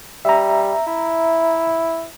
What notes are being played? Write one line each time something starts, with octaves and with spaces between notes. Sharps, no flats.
G3 E5 A#5
E4